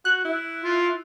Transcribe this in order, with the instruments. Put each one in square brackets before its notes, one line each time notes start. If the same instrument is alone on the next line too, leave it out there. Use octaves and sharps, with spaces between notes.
[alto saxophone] F#4 [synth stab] F#6
[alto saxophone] E4
[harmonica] F4